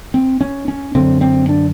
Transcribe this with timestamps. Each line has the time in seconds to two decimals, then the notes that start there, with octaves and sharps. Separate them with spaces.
0.14 C4
0.41 C#4
0.68 C#4
0.95 F#2 D3 C4
1.21 C4
1.49 D4